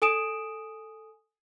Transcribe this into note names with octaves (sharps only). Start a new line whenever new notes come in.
A4 G#5 D#6 D7 E7